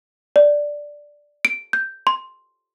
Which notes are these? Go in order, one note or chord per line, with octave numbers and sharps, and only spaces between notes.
D5
D7
G6
C6